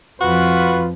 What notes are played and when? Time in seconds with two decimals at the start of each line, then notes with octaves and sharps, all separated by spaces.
0.21 F2 F3 F4 F#4 B4